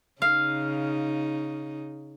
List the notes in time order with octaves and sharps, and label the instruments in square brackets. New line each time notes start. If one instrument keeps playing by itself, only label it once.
[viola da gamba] C#3 D#4 [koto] F5